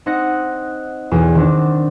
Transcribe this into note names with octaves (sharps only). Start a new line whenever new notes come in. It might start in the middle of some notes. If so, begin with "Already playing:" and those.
C4 D#4 F#5 A#6 C#7
B1 E2
D#3 C4 D4